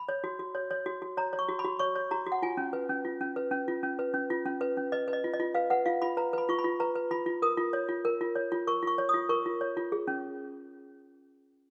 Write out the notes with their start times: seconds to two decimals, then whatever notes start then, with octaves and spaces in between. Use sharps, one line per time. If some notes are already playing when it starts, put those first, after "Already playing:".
Already playing: B5
0.09 C#5
0.24 F#4
0.39 F#4
0.55 C#5
0.71 C#5
0.86 F#4
1.02 F#4
1.17 C#5 A#5
1.33 C#5
1.39 C#6
1.49 F#4
1.59 B5
1.65 F#4
1.79 C#5 C#6
1.95 C#5
2.11 F#4 A#5
2.26 F#4
2.32 F#5
2.42 F4 G#5
2.57 C#4
2.73 B4
2.89 C#4
3.05 F4
3.21 C#4
3.36 B4
3.51 C#4
3.68 F4
3.83 C#4
3.99 B4
4.14 C#4
4.30 F4
4.46 C#4
4.61 B4
4.77 C#4
4.92 B4 D#5
5.08 B4
5.13 D#5
5.24 F4
5.33 D#5
5.40 F4
5.54 B4 F5
5.70 B4 F#5
5.86 F4 F5
6.02 F4 B5
6.17 B4 A#5
6.33 B4 B5
6.49 F4 C#6
6.59 B5
6.64 F4
6.80 B4 A#5
6.95 B4
7.11 F4 B5
7.26 F4
7.42 A#4 D#6
7.57 F4
7.73 C#5
7.89 F4
8.05 A#4
8.21 F4
8.35 C#5
8.52 F4
8.67 A#4 C#6
8.82 F4 C#6
8.98 C#5
9.09 F4 D#6
9.29 A#4 C#6
9.46 F4
9.61 C#5
9.77 F4
9.92 G#4
10.08 C#4